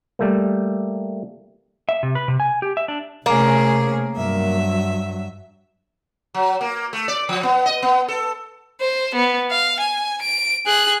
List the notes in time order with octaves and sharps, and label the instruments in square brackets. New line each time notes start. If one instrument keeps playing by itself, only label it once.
[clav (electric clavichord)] G3 A3 A#3
[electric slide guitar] E5
C3
B4
C3
G#5
G4
E5
D4
[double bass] C3 [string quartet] A3 C#4 G#4 [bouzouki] A#3
[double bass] G2 F#3 [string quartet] E5
[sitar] F#3
A#3
A3
D5
F3
B3
D#5
B3
A4
[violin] C5
B3
F5
G#5
D7
G#4 F#6